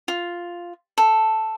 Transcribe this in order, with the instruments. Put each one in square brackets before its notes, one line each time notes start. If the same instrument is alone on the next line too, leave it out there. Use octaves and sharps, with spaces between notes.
[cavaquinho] F4
A4